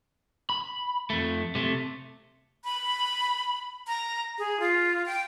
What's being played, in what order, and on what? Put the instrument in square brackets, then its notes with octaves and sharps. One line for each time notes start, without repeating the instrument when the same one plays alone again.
[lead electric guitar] B5
F2 A3
C3 A3
[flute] B5
A#5
G#4
F4
G5